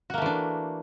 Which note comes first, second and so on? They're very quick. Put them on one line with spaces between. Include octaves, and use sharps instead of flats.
F#4 A#3 A3 E3 D4